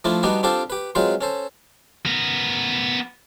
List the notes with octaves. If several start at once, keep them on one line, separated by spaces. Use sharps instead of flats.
F3 A3 D4 E4 F4
G3 B3 D4 D#4 F#4 G4
C4 D4 F4 G4 A4 C5
G4 B4
F#3 G#3 C4 F4 B4 C5
C#4 A4 C5
B3 A#4